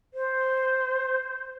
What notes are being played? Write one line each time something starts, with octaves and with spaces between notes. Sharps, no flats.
C5